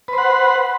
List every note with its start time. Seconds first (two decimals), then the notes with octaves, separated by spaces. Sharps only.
0.08 B4
0.13 C5
0.18 F#5